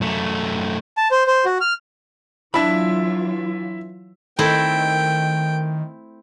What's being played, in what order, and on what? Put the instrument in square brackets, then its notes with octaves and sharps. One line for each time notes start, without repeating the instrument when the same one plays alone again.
[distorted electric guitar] F#2 A3
[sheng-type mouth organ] A5
C5
C5
F#4
F6
[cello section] E3 F#3 F4 [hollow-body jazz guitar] D4 A5 B5 [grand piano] E4 E5
[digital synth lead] D#3 [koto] A3 C4 E4 [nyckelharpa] G5